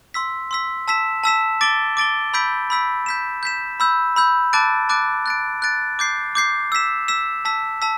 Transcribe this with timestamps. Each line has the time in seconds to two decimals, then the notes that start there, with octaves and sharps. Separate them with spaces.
0.14 C6 E6 B6
0.51 C6 E6 B6
0.88 A5 E6 B6 E7
1.24 A5 E6 B6 E7
1.61 D6 A6 D7 G7
1.97 D6 A6 D7 G7
2.34 B5 E6 G6 B6 D7
2.70 B5 E6 G6 B6 D7
3.06 G6 B6 E7
3.43 G6 B6 E7
3.80 B5 E6 G6
4.16 B5 E6 G6
4.53 A5 D6 F#6 A6 D7
4.89 A5 D6 F#6 A6 D7
5.26 F#6 A6 D7
5.62 F#6 A6 D7
5.99 D6 G6 C7
6.35 D6 G6 C7
6.72 E6 B6 E7
7.08 E6 B6 E7
7.45 A5 E6 B6
7.82 A5 E6 B6